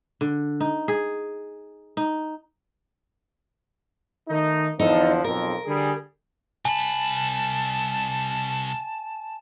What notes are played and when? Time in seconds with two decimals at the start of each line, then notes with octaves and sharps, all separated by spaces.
0.21 D3
0.61 D#4
0.88 G#4
1.97 D#4
4.28 D#3 A3 D#4
4.79 E2 D3 F3 D#4 A4
5.24 B1 F2 A#4
5.66 D3 G3 G#4
6.65 C2 G#5 A5 B5